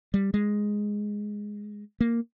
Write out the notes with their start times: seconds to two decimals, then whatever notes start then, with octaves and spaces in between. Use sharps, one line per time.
0.14 G3
0.34 G#3
2.01 A#3